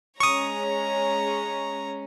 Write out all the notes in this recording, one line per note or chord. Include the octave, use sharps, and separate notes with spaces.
G#3 C#4 C#5 A#5 C#6 D#6